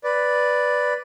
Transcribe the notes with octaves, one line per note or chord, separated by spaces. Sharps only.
B4 D5